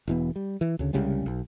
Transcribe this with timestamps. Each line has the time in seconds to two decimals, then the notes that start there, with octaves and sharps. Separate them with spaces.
0.07 E1 E3 B3
0.36 G3
0.61 E3
0.79 D2 C#3
0.93 C2 C#3 G3 G#3
1.26 B1